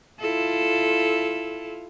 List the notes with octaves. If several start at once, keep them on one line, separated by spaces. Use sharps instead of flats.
E4 F4 A4